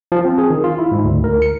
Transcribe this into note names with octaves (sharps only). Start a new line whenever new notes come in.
F3
C4
G#4
D#3
F4
E4
G#2
D2
A#4
C#7